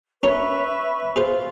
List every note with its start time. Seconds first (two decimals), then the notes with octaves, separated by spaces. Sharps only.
0.23 C#4 A#4 B4 C#5 E5 C#6
1.16 F4 G#4 B4 C5